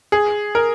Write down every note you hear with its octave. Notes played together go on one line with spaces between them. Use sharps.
G#4
A#4